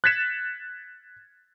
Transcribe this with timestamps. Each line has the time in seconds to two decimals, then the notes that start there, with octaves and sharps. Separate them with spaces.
0.04 F#6 G#6 A6 B6 C#7 E7